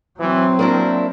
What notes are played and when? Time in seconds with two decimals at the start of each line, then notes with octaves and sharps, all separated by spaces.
0.20 E3 F#3 C4
0.59 A#3 D4 E4 A#4